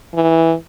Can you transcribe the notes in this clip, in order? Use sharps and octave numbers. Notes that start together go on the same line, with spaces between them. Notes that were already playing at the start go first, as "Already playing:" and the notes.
E3